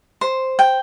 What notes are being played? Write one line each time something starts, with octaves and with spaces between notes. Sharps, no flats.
C5
G5